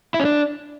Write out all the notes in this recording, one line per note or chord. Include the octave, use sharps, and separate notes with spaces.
E4
C#4
D4